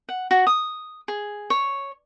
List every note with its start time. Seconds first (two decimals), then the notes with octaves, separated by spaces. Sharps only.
0.09 F#5
0.31 F#4
0.47 D#6
1.08 G#4
1.50 C#5